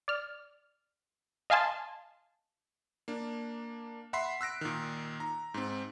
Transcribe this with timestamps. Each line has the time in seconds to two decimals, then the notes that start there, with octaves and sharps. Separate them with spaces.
0.08 D5 F6
1.50 D#5 F5 G#5 A5 C6
3.08 A#3 D4
4.13 E5 F#5 B5 C6 B6 C7
4.41 E6 F#6 A#6 D7
4.61 A#2 D#3
5.20 A#5
5.54 G#2 C4